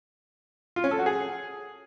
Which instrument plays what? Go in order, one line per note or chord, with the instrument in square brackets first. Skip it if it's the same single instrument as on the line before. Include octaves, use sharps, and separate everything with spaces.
[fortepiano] F4
C#4
A4
F#4
G#4